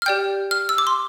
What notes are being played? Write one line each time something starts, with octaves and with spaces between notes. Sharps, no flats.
F6
G4 D5 G5 G6
F6
E6
D6
C6